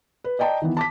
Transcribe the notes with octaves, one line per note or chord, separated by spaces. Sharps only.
B4
D5 D#5 G5 A5 A#5
D#3 E3 B3
A5 D6 B6